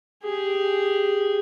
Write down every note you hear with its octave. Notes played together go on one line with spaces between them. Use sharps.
G4 G#4